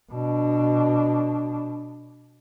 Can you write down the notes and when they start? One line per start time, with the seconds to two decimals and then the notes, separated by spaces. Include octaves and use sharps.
0.12 B2 D4